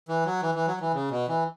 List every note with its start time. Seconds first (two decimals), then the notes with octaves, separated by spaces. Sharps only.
0.09 E3
0.26 F#3
0.43 E3
0.55 E3
0.67 F#3
0.81 E3
0.94 C#3
1.11 B2
1.28 E3